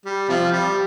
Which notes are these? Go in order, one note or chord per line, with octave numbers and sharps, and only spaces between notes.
G3
C3 F3
G3